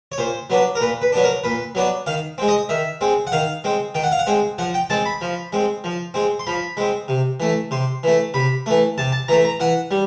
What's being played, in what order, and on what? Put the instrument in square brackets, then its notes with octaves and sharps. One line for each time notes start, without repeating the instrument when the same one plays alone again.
[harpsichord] C#5
A#2 C5
F#3 B3 D4
A#4
A#2 B4
B4
F#3 B3 D4
A#4
A#2 B4
F#3 B3 D4
D#3 F5
G#3 C4
D#5
D#3 E5
G#3 C4
F#5
D#3 F5
G#3 C4
D#3 G5
F#5
F5
F#5
G#3 C4
F3 F#5
G5
G#3 C4 A5
B5
F3
G#3 C4
F3
G#3 C4
C6
F3 B5
G#3 C4
C3
E3 A3
C3 C6
E3 A3
C3 B5
E3 A3
C3 A5
A5
E3 A3 A#5
A#5
E3 F#5
G3